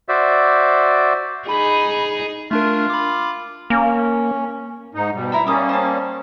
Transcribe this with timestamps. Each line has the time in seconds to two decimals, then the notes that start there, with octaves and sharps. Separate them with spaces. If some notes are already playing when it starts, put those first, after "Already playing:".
0.09 F#4 C5 D5 E5
1.48 D#4 G#4 B5
2.51 A3 D4 F4 A#4
2.90 B5 D6
3.70 A#3 C#4
4.95 G#2 D#4
5.14 B2 G3
5.32 E4 A#5 B5
5.47 G3 A#3 C#4 D6 D#6
5.69 C5 A5